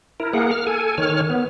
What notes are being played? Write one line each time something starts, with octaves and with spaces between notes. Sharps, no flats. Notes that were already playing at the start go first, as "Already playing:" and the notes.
E4 A#4
A#3 G#4 A#4 F#5
F6
A4 G#5
D#3 C#5 F6
B3